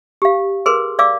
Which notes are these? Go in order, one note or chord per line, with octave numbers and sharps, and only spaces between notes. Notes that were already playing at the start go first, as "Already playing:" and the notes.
G4 F5
G#4 A#4 B4 C6
D5 F5 D6 E6